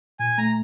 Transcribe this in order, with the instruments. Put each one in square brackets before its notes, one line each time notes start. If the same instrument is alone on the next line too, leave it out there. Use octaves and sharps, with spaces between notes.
[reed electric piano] A#2 [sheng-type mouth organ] G#5
[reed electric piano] A3 [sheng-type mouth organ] A#5